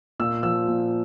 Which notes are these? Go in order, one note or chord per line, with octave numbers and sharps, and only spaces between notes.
A#2 E6
F3 E6
A#2